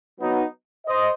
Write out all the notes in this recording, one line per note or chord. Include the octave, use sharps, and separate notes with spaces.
F#3 B3 D#4
C5 D#5